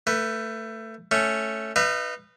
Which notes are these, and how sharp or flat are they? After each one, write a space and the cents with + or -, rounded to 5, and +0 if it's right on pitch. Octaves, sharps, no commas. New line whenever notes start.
A3 +20 B4 +0
A3 +0 C#4 +0
D#4 -25 B4 +0 E5 +45